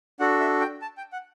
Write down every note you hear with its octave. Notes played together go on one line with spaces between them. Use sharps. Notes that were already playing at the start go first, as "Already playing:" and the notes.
D4 F#4 A4 F#5
E5
G5
A5
G5
F#5